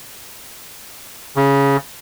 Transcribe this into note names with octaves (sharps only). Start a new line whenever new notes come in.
C#3